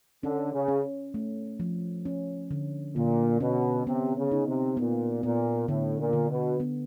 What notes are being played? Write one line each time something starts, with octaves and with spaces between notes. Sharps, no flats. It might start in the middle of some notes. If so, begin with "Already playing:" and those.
D3 C#4
C#3
C#4
A3
F3
C#4
D3
A#2 D3
B2 C#4
C3 B3
C#3
D#4
C3
A#2 B3
A#2 B3
A2 D3
A#2
D3
B2
B3